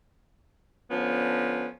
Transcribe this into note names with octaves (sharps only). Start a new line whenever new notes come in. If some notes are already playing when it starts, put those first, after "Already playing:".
D3 F3 B3 C#4